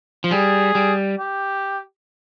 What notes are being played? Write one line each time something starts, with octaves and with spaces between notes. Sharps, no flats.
F3
G3 G#4
G3
G4